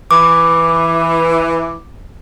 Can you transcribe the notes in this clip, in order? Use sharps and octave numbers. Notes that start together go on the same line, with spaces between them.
E3 D6